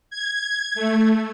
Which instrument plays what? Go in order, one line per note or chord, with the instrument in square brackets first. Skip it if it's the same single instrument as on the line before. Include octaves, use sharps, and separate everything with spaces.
[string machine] G#6
A3